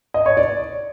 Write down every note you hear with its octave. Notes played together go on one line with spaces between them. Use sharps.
D#5
C#5
D5